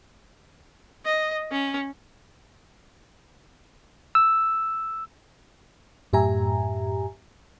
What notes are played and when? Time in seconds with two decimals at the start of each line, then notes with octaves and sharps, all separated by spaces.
1.05 D#5
1.51 C#4
4.15 E6
6.13 F#2 A2 G4 E5 G#5 A#5